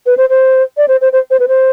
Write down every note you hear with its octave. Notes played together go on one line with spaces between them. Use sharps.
B4
C5
C5
D5
C5
C5
C5
C5
B4
C5